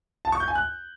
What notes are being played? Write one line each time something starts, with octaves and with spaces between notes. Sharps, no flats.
A5
C#6
G6
G#5
F#6